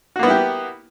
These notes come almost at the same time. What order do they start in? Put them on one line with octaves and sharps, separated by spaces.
F#4 A#3 B3 E4 G4